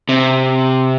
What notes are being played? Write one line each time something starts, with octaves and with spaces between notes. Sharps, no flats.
C3